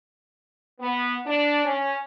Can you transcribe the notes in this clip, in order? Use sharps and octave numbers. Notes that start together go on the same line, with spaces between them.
B3
D4
C#4